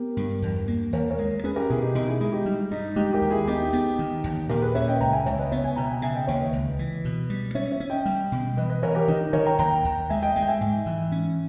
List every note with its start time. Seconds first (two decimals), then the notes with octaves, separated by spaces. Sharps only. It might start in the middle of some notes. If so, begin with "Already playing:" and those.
Already playing: B3 G4 A#4
0.17 G2
0.42 E2
0.68 A#3
0.93 D#2 A#4 C#5
1.10 A#4 C#5
1.19 G#3
1.44 C#4 G#4 B4
1.56 G4 A#4
1.70 B2 E4 G#4
1.82 D#4 G4
1.95 B2 D#4
2.07 E4 G#4
2.21 G#3 E4 G#4
2.32 D#4 G4
2.46 G3
2.71 G2 D#4
2.96 G#3 D#4 G4
3.13 G4 A#4
3.22 D#2
3.31 E4 G#4
3.47 B3 D#4 G4
3.73 B3
3.99 D#3
4.24 D#2
4.49 A#2 G4 A#4
4.62 G#4 B4
4.75 C#4 C#5 E5
4.88 D#5 G5
5.01 C#2 G5 A#5
5.13 E5 G#5
5.26 C#2 C#5 E5
5.39 B4 D#5
5.51 B3 C#5 E5
5.64 E5 G#5
5.76 B2 G5 A#5
5.90 E5 G#5
6.02 C#3 E5 G#5
6.15 D#5 G5
6.27 D#2 C#5 E5
6.40 B4 D#5
6.53 C#2
6.79 E3
7.05 B2
7.30 G3
7.55 C#4 C#5 E5
7.72 C#5 E5
7.80 C#4
7.90 D#5 G5
8.06 G3
8.32 B2
8.57 E3 B4 D#5
8.70 B4 D#5
8.82 E3 A#4 C#5
8.95 G4 A#4
9.08 D#3 D#4
9.21 D#4
9.33 D#3 A#4 C#5
9.46 G5 A#5
9.59 D#2 G5 A#5
9.85 D#2
10.10 G#3 E5 G#5
10.23 D#5 G5
10.36 G#3
10.43 G5
10.47 E5 G#5
10.61 G#2
10.86 E3
11.12 C#4